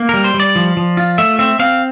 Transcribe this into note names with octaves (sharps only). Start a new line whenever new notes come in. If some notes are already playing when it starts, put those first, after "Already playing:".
Already playing: A#3
G3 A#4
C5
G3
D5
F3
F3
F4
A3 E5
C4 E5
C4 F5